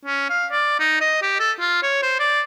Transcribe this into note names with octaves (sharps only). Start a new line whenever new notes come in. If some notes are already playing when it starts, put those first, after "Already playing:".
C#4
F5
D5
D#4
D#5
G4
A4
F4
C#5
C5
D5